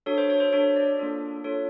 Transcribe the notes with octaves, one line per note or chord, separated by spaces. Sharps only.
D4 F#4 A4 C#5
C5
C#5
C5
D4 F#4 A4 C#5
D5
A#3 D4 F4 A4
A#3 D4 F4 A4 C#5